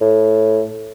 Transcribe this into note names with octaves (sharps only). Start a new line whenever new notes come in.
A2